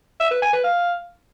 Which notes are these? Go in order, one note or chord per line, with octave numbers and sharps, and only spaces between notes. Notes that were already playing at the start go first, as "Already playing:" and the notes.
E5
B4
G#5
B4
F5